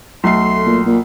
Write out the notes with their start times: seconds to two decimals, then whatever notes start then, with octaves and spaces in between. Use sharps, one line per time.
0.24 B1 A3 C6 C7
0.66 A#2
0.86 A#2